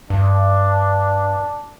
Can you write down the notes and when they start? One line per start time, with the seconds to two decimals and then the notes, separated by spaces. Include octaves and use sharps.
0.10 G2 D4